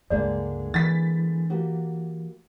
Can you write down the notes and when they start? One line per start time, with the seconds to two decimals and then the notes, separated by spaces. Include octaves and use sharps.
0.10 C#2 G2 D3 G#3 A#3 D5
0.74 E3 A6 B6
1.50 A#3 F#4 G4